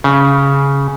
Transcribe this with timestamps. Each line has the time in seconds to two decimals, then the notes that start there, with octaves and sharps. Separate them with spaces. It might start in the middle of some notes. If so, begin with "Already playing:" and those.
0.04 C#3